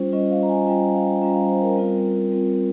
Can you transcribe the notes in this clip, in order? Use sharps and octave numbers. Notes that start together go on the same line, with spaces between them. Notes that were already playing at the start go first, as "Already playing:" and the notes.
Already playing: G3 C#4 F4 C5
G3 C#4 F4 D#5
F5
A#5
G#5
G3 C#4 F4 G5
F5
G3 C#4 F4 A#5
F5
C5
A#4
G3 C4 F4
G3 C4 F4